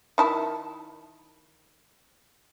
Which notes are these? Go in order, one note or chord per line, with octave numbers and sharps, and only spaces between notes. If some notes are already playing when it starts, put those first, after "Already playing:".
D#3 E4 A5